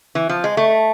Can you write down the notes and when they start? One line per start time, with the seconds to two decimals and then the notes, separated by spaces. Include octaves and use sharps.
0.15 E3
0.29 F3
0.44 G#3
0.57 A3